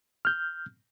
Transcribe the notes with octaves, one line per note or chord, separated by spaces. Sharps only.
F6 G6